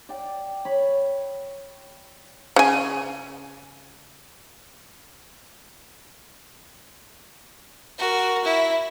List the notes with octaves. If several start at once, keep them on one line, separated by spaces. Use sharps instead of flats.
D5 G5
C#5 B5
C#3 G#5
F#4 A#4
E4